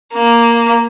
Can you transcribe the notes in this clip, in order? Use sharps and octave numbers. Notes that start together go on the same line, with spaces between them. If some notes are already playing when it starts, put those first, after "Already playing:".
A#3